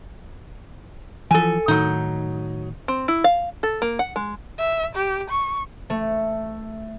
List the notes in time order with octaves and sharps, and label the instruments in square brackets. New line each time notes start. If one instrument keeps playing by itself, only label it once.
[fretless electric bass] E3 F3 [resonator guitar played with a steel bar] A4 G#5
[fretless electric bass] A2 D#3 [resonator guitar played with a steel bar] F#3 D#4
[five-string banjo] C4
E4
F5
A4
A#3
F#5
G#3
[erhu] E5
G4
C#6
[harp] A3